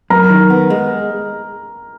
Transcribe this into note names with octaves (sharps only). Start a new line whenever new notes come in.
F#2 A#4 A#5
D#3
B3
G#3